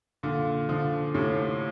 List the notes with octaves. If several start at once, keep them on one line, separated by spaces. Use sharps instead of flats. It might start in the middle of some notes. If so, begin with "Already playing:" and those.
A#2 D3
D3 F3
A2 C3